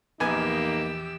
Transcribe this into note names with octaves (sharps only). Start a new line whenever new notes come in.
A#1 E2 A#3 B3 D#4 G4 G#5 E6